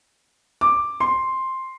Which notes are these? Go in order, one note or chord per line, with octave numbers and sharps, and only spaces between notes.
D6
C6